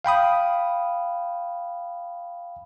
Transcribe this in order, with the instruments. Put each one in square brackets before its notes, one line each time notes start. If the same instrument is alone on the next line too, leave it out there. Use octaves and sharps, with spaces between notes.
[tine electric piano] F5 G5 B5 D#6